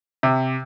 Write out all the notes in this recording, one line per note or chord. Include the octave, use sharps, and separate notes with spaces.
C3